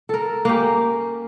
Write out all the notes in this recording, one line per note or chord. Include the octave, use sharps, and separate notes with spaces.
A4 A#4
A#3 C#4 G4